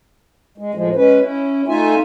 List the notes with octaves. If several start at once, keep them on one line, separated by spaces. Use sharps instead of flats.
G#3
A2 F3 G#3
G#3 C#4 B4
C#4 E4
A3 D#4 F4 E5 G#5